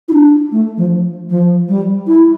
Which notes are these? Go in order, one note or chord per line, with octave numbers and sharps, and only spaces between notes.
E4
D4
A3
F3
F3
G3
E4